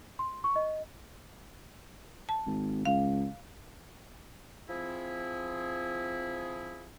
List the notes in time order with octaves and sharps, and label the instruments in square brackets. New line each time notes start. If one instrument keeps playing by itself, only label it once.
[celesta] C6
C#6
D#5
[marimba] A5
[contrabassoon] G#1
[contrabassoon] C#2 [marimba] F5
[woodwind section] F3 C4 E4 G#4